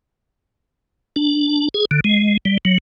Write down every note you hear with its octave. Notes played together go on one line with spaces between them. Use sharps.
D4
G#4
D3
G#3
G3
F#3